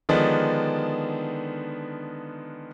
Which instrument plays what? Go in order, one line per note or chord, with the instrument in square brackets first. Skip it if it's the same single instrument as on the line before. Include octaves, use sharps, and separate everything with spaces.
[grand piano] D3 D#3 F3 G#3 B3 D4